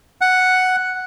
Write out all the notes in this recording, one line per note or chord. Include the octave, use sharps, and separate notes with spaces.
F#5